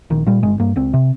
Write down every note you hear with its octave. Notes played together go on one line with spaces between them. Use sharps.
A#1 D#3
A#2 G3
G1 G#3
G2 A#3
C#2 C4
C3